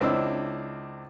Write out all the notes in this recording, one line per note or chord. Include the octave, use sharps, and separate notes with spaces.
C#2 C4 D4 E4 D#5 E6